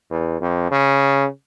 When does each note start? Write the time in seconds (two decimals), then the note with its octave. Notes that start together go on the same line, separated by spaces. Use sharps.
0.11 E2
0.41 F2
0.71 C#3